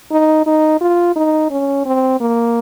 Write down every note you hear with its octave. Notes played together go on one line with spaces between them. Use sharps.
D#4
D#4
F4
D#4
C#4
C4
A#3